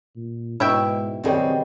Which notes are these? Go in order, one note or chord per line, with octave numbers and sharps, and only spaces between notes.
A#2
G#2 B2 E4 E5 G5
F#1 D#3 G3 B3 C4 G#4 C#5